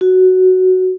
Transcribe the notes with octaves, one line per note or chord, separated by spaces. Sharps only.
F#4